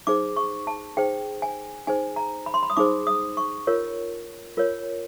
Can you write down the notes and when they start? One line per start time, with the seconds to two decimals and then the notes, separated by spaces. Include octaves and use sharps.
0.07 D#4 G#4 C5 D6
0.37 C#6
0.67 A5
0.97 D#4 G#4 C5 G5
1.42 G#5
1.87 D#4 G#4 C5 G#5
2.16 A#5
2.46 B5
2.54 C6
2.63 B5
2.70 D#6
2.77 D#4 G#4 C5 D6
3.07 D#6
3.37 C#6
3.67 F4 A#4 C#5
4.57 F4 A#4 C#5